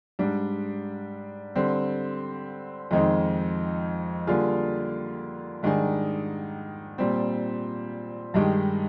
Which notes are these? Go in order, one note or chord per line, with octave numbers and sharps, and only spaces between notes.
G#2 G3 D4
D3 G3 C4
F2 D#3 G#3 C4 D#4
D3 G3 A#3 F4 G#4
G#2 D#3 G3 D4 G#4
A#2 G3 C4
G2 D#3 G#3 D#4 G4